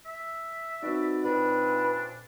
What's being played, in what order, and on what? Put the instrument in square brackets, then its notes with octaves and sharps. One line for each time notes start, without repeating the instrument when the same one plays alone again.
[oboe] E5
[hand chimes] C4 D#4 [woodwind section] F#4 B4 D5
[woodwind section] F2 A#2 [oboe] D4 [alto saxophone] B4